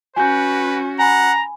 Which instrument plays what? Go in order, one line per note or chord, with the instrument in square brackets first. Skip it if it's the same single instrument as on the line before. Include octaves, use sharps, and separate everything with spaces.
[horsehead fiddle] C#4 F#4 [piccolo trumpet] B4 [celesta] G#5 G6
[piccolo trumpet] F#5 [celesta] G#5 B5 [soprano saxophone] A#5